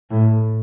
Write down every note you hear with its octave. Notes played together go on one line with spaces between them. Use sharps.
A2